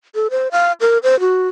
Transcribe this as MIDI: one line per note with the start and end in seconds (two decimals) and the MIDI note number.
0.15 0.27 69
0.31 0.48 72
0.52 0.72 77
0.81 0.98 70
1.03 1.19 72
1.20 1.48 66